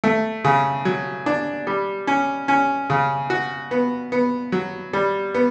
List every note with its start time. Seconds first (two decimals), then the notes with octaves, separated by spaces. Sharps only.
0.04 A3
0.45 C#3
0.85 F#3
1.26 D4
1.67 G3
2.07 C#4
2.48 C#4
2.90 C#3
3.30 F#4
3.71 B3
4.12 B3
4.52 F#3
4.93 G3
5.34 B3